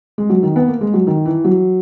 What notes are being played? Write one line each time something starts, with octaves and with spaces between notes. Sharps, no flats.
G#3
F#3
D#3
B3
A#3
G#3
F#3
D#3
E3
F#3